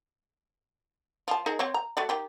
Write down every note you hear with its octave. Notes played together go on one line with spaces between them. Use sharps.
F3 A5
D#4 G#4 A#4
C4 C5 C#5
A#5
A3 F#4 D5
D#3 G4